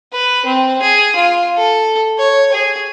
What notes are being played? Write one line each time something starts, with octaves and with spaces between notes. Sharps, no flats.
B4
C4
G#4
F4
A4
C#5
G#4